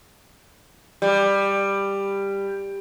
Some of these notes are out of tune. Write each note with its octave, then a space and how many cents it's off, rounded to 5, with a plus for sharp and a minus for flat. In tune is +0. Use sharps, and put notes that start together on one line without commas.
G3 +10